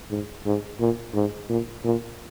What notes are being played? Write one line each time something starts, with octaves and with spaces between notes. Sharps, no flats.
G#2
G#2
A#2
G#2
A#2
A#2